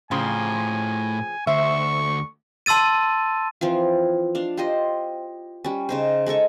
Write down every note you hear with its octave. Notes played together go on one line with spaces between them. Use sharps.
A2 C#3 F3 C4 G#5 C6
D2 C5 E5 C#6
A5 C6 E6 A6 D#7
E3 F3 C4 F4
D4 F5
F4 G4 C5 D#5
G3 C#4
C#3 D#4 C5
G#3 D#4 A4 C#6